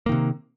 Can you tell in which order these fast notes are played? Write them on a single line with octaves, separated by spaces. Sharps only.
A#3 D#3 C3